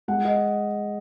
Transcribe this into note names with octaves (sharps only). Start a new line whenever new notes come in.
G#3 F#5
D#5